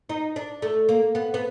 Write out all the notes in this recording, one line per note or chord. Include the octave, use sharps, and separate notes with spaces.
D#4
D4
A3
A#3
B3
B3